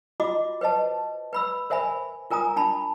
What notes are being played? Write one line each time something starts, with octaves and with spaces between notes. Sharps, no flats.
F4 F#4 D#5 D6
B4 C5 D#5 A5
B4 B5 E6
A#4 C5 E5 G#5 B5
F4 A#4 G#5 A#5 D#6
D4 A5 B5